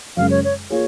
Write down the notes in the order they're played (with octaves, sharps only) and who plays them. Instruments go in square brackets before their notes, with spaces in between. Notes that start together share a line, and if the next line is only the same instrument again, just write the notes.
[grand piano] F#2 C#3 G#3 [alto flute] F5
[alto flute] C#5
C#5
[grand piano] A#3 F4 G#4 [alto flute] C#5